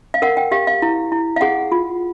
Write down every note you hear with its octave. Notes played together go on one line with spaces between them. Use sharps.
F5
A#4 F#5
G5
G4 F5
F5
E4
E4
F5
G#4 F#5
F4